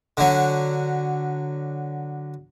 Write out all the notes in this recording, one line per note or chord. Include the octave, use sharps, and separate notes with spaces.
D3 F#3